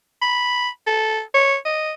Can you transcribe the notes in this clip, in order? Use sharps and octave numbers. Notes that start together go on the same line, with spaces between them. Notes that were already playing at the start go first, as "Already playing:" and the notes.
B5
A4
C#5
D#5